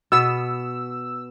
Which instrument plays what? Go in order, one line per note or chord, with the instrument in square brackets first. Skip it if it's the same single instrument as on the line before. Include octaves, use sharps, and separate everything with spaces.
[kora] B2 B3 [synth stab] E6